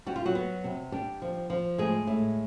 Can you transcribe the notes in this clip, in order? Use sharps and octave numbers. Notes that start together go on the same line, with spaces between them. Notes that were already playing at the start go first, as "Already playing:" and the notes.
G3 F#4
F4
F#3 F#4
B3
C3
G3 D4 G4
F3
F3
A2 G#3 G#4
A2